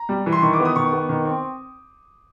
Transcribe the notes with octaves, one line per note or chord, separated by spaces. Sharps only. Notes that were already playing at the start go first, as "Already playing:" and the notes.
Already playing: A#5
G3
E3
C6
D#3 C#6
D6
B3
D#6
D#3 C#6
B3
D#3
C4